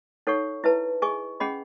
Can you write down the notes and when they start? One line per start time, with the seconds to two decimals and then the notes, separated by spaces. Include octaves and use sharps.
0.27 D#4 A4 C#5 F#5 C#6
0.64 E4 B4 E5 A5
1.02 G#4 D#5 G#5 C#6
1.40 C#4 G#4 D#5 F#5 B5